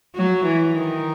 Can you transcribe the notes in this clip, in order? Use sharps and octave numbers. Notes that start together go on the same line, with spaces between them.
F#3
E3
D#3